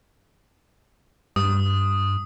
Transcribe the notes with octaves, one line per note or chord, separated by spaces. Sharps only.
G2 D#6